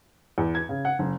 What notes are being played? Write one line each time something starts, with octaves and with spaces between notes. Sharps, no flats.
E2
G#6
C#3
F#5
F#1